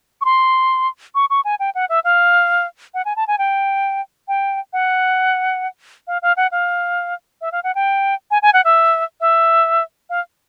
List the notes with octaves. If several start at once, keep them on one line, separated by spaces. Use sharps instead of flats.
C#6
C6
C#6
C#6
G#5
G5
F#5
E5
F5
F#5
G#5
A5
G#5
G5
G5
F#5
F5
F5
F#5
F5
E5
F5
F#5
G5
G#5
G#5
F#5
E5
E5
F5